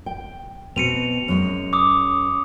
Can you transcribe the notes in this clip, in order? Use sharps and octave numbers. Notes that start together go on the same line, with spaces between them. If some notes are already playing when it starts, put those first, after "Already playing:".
G5
B2 C4 C#7 D#7 F7
F#2 G#3
D6 D#6